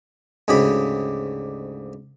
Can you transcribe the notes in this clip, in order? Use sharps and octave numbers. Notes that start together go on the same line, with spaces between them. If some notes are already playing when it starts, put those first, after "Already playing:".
D2 G#2 C#3 G4 B5